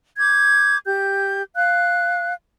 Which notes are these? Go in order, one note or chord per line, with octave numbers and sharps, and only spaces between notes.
D6 G6 G#6
G4 G6
F5 F#6